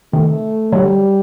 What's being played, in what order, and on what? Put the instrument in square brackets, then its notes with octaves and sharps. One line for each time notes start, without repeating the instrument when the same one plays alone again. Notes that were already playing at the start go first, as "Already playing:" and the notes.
[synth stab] C3 D#3 [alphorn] A3
[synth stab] D3 F#3 [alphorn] G3